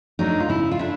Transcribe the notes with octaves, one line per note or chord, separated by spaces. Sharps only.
F#3 A3 D4 D#4
F4
C#3 E4
F4
A3 D4 E4